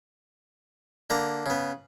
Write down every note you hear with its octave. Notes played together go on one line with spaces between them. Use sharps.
D3 A#3 A#5
C#3 B3